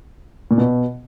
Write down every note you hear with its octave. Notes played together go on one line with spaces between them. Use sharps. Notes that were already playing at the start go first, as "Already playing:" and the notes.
A#2
B2